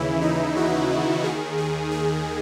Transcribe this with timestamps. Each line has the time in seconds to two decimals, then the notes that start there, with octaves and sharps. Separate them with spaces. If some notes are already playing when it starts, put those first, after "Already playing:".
Already playing: D#2 C#3 E3 E4
0.22 D#4
0.57 F#4
1.24 D#2 D#3 G#4
1.58 G#4
1.91 G#4